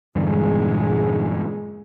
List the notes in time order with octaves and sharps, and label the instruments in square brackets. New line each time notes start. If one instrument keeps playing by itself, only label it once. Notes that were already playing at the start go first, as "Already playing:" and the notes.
[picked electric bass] E2 G2 D3 [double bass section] A#2 G#3